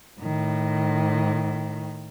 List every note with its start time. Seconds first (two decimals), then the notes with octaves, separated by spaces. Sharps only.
0.21 A2 D#3